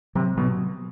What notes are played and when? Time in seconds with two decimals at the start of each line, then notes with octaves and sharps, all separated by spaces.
0.15 C3 F#3
0.37 B2 F#3